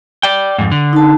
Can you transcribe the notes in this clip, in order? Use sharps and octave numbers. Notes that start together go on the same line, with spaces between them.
D5 G5
F2 G#2
D3
D#4 A5